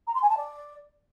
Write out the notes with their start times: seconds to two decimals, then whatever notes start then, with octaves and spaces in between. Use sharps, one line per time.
0.07 A#5
0.14 C6
0.22 G#5
0.29 A5
0.37 D5